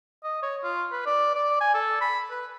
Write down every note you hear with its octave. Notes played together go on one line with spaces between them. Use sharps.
D#5
C#5
F4
B4
D5
D5
G#5
A4
B5
B4